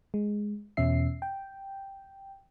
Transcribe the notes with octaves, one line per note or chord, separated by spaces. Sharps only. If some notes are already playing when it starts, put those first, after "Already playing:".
G#3
E2 B2 C#4 E5 C7
G5